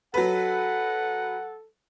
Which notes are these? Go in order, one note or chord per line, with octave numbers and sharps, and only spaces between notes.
F#3 A4 B4 F#5